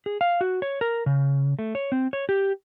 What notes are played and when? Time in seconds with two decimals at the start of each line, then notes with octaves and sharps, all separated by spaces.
0.06 G#4
0.21 F5
0.41 F#4
0.62 C#5
0.81 A#4
1.06 C#3
1.59 A3
1.75 C#5
1.92 C4
2.13 C#5
2.29 G4